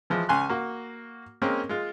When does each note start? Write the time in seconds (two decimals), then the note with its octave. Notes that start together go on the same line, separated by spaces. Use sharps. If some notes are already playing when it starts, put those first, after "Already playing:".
0.10 E3 F3 G#3
0.29 C#2 G#5 C6 F#6
0.49 A#3 F#4
1.42 G#3 A#3 C4 C#4 A#4
1.69 G#3 F4